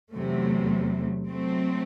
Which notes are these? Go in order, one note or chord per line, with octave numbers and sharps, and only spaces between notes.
E2 C3 F#3 A3
F#3 A3 C4